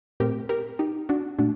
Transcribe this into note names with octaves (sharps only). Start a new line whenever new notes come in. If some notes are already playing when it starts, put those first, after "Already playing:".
A#2 A3 C4 G4 A#4
G4 A#4
D#4 G4
D4 F#4
A#2 A3 D4 F#4